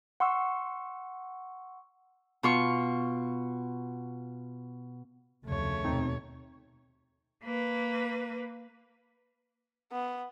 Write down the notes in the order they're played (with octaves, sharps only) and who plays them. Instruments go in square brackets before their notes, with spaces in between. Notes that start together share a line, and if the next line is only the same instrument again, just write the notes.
[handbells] F#5 C6 C#6 E6
[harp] B2 F4 C#6
[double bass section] F1 D2 C#3 [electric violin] A3 C#5
[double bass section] D#2 B2 [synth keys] C4 D#4
[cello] A#3 B4
[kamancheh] B3